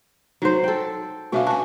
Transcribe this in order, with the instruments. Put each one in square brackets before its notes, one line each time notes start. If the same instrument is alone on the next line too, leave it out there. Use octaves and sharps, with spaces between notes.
[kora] F#3 C5 [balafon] D#4
[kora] A4 G5
[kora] B2 C#4 D4 [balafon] F#4 E5 F5
[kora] F#4 [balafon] G#5 A5